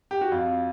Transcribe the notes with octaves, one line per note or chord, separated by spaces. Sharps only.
G4
F#4
F2 F4